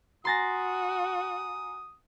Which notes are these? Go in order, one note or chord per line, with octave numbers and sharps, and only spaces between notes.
F#4 G#5 A#5 C6 D#6 A6 A#6